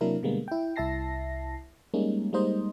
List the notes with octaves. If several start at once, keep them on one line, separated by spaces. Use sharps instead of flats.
C3 F#3 A#3 D4 E4 A#4
B2 D3 G3 G#3 A#3 B3
E4 G5
C2 E4 E5 A5 A#6 C7
G3 G#3 A#3 C#4 D#4
G3 G#3 A#3 D#4 C5 D#5